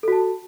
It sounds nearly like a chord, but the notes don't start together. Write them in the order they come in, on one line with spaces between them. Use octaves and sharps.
A4 F#4 A5